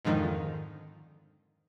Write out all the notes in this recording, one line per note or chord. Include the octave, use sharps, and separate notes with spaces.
F2 G#2 D3 D#3 F3